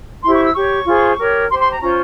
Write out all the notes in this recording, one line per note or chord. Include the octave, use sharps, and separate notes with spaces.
E4 G4 C5 C6
C#6
E6
G4 C#5 C#6
F4 G#4 C5
G4 A#4 C#5
G4 C5 C6
C6
A#5
C#4 F4 C5 A#5